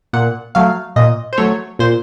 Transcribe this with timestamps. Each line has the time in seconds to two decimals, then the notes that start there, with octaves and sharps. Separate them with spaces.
0.13 A#2 F#5
0.55 F#3 A3 F5
0.96 A#2 D#5
1.33 C5
1.38 F#3 A3 C#5
1.79 A#2 C5